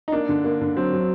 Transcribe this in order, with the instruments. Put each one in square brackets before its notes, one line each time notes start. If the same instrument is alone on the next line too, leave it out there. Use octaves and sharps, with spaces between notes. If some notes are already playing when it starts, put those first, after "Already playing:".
[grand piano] D#4
[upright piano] A#3 [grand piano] D4
[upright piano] D3
A#3
D3
[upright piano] F#3 [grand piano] C4
[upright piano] F#3